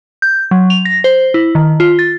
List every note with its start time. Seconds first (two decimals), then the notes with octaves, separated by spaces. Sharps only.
0.22 G6
0.51 F#3
0.70 F7
0.85 A#6
1.04 C5
1.34 E4
1.55 D#3
1.80 F4
1.99 A6